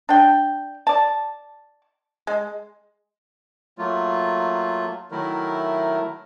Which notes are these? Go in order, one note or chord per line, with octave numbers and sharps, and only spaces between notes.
D4 G5
D5 A5
G#3
F#3 A3 A#3 F4
D#3 F#3 A3 E4 A#4